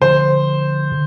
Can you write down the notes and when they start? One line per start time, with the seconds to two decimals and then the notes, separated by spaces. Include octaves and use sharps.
0.01 D3 F3 A3 C5
0.91 D3